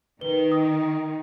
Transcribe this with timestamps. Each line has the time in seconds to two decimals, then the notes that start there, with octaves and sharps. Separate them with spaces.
0.21 D#3 B4 G7
0.52 D#6